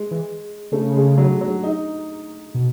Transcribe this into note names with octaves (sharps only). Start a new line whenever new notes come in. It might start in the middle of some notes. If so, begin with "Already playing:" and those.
Already playing: G#3
E3
C#3 A3
G#3
F#3
F#3
D#4
B2